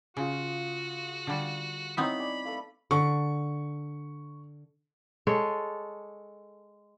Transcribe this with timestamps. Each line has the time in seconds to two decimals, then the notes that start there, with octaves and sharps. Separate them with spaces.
0.17 C#3 F4 F#4 G#4
1.27 D3 G3
1.97 B3 C4 D#4 E4 C#5 B5
2.19 D5 G#5
2.45 A3 B4 F5
2.91 D3 C#6
5.27 G#3 A4 C#5